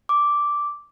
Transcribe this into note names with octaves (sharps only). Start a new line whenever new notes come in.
D6